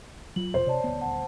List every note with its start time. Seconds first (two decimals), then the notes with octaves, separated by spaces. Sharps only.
0.36 F#3 F4 F#7
0.54 E2 B2 C5
0.67 C3 C#5 D5 A5
0.84 D#1 D2 B3
1.01 F#5 A5